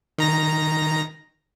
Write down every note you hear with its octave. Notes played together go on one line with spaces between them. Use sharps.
D#3 A#5 A#6